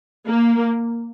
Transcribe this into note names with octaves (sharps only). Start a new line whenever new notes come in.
A#3